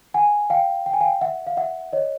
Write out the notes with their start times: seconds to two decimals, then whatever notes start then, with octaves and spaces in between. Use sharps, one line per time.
0.14 F#5 G#5
0.50 F5 G5
0.86 G5
0.94 G#5
1.01 F5 G5
1.21 E5 F#5
1.47 F5
1.57 E5 F#5
1.93 C#5 D#5